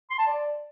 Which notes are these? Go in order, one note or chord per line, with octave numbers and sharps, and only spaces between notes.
C6
A5
D5